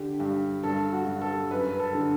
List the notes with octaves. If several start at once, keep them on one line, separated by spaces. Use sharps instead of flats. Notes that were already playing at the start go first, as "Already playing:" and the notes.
Already playing: D3 G4
G2 G4
G2 A4
F#4
G2
A4
F#2 B4
B4
A4
D3